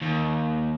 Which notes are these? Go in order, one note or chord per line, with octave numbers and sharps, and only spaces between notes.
D#2